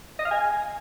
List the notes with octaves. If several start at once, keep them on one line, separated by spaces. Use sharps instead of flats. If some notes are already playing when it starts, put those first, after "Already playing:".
D#5
F5
G#5